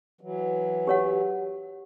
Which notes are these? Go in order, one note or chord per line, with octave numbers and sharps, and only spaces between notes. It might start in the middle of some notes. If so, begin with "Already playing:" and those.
E3 F#3
G4 C#5 F#5